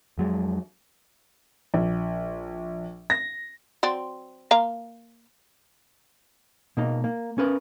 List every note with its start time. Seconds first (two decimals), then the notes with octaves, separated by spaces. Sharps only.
0.18 F2 F#3 G#3
1.74 A#1
3.10 A#6
3.83 F#3 C4 D5
4.51 A#3 F5 A#5
6.77 B2 A#3 D#4
7.04 A#3
7.38 C#4 A#4 B4